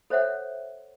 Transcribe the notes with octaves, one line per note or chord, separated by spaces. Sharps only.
A4 C5 C#5 E5 F#5